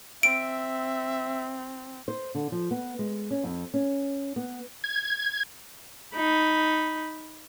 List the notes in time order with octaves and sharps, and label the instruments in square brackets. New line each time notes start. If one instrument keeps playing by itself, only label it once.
[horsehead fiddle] C4 [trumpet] E5 [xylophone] D7
[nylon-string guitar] C5
D3
F3
B3
G#3
C#4
F2
C#4
B3
[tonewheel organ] G#6
[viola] D#4 B5